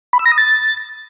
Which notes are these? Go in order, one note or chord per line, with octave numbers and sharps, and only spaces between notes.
B5
E6
A#6
D#6
A6